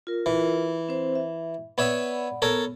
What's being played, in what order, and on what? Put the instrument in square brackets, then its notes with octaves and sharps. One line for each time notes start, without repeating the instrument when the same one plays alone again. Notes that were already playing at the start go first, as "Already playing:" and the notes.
[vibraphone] F4 A#4
[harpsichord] E3
[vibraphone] C4 C5
E5
[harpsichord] B3 C#5 E5 [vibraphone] D5 F#5 B5
[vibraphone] B3 [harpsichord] A4 A#4 C#5